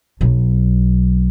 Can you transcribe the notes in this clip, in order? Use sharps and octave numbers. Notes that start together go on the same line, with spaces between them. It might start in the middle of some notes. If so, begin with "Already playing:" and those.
B1 F#3